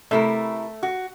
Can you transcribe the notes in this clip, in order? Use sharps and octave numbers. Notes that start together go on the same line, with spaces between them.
C3 A3 E4 A#4
F#4